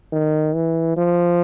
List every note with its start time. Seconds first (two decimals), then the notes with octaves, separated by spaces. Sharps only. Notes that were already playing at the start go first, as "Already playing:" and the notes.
0.12 D#3
0.55 E3
0.97 F3